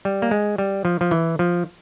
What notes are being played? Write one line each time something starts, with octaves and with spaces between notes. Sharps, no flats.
G3
A#3
G#3
G3
F3
F3
E3
F3